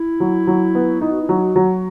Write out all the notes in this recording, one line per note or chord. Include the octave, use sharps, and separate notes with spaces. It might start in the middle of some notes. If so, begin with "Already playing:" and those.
Already playing: E4
F#3
F#3
B3
D#4 E4
F#4
E4
F#3
F#4
F#3